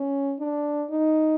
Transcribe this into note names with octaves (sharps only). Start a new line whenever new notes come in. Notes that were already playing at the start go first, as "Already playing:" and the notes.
Already playing: C#4
D4
D#4